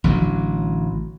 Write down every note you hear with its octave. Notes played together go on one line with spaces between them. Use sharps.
A1 D3 F#3